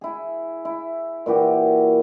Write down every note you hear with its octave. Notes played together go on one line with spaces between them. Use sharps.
E4 G#4
E4
A#2 E3 F#4 G4